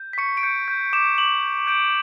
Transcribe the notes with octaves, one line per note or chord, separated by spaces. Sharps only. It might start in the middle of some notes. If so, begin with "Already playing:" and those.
Already playing: G6
B6
C#6 C#7
D7
G6 C#7
G6
D6 E7
D6 F#7
G6
G6 D7